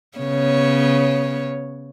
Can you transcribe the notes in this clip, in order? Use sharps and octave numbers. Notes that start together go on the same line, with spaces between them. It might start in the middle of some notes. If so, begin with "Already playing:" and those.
C#3 B3 C#5